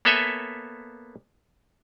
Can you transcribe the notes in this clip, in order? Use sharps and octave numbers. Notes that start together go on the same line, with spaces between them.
A#3 B3 A4 C#5 E5 G#5